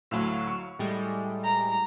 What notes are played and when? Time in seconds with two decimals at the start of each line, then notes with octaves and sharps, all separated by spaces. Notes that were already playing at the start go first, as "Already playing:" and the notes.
0.11 D2 A2 F#3 F5 E6
0.47 C#6
0.79 A2 G3 G#3
1.43 A#5